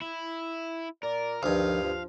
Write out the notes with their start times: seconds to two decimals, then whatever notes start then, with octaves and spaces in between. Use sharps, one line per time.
0.02 E4
1.03 A#2 A#4 D5
1.43 D2 G2 D#3 F3 F5
1.82 F3 D4